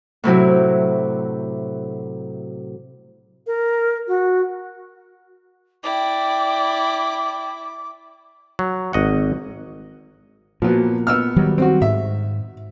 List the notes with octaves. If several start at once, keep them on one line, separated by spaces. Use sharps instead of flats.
A2 C3 F#3 E4
A#4
F#4
E4 D5 G5 D6
F#3
G#1 D#5 F#5
A#2 F3 F#3 B3
B3 E6 F6
D#3 F#3 G3
C4 F#4
G#2 E5